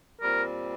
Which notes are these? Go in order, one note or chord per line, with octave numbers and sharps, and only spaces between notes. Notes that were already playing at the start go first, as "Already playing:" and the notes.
A#2 G3 C4 A#4